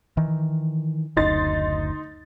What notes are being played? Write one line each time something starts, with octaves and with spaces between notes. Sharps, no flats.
D#3 E3
F#1 D2 D#4 C6 A6